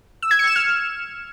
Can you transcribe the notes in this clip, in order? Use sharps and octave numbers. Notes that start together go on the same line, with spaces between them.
E6
G#6
C#7
E7
F6